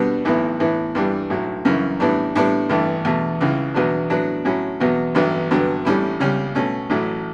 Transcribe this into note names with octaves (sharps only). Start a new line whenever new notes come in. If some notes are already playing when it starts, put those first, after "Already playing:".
Already playing: B2 G3 B3 D4
B1 A2 E3 B3
A2 E3 B3
G2 E3 G3 D4
B1 A2 F#3
F#2 C#3 E3
A2 E3 G3 B3 D4
A2 G3 B3 D4
A1 G2 E3 A3
E2 B2 A3
C#2 C#3 E3
E2 B2 F#3 B3 D4
A2 F#3 B3 D4
A2 F#3 C#4 E4
E2 B2 F#3 B3
A1 G2 F#3 B3
G2 D3 F#3 B3
A1 A2 G3 C#4 E4
C#2 C#3 G3 C#4
B2 A3 C#4
A1 A2 F#3 A3